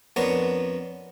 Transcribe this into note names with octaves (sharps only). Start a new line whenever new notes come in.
F2 B3 D4 A#4 C#5